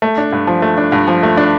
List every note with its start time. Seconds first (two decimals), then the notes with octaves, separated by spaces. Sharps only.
0.02 A3
0.18 D4
0.32 G2
0.47 F3
0.62 A3
0.78 D4
0.92 G2
1.08 F3
1.23 A3
1.37 D4